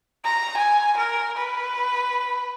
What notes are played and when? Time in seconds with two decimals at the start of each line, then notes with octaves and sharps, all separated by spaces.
0.25 A#5
0.57 G#5
0.97 A#4
1.37 B4